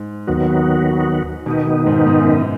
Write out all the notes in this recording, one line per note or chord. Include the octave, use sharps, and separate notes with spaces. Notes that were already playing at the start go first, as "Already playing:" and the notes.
Already playing: G#2
D#2 D#3 F#3 B3 F#4
B2 D#3 B3 D#4
B2
G#2
G#2
F#2